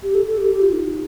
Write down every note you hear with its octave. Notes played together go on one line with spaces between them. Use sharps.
G4
A4
A4
G4
G4
F4
D#4